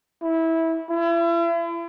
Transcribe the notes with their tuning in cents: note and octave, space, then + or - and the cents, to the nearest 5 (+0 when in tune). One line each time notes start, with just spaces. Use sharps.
E4 -15
E4 +40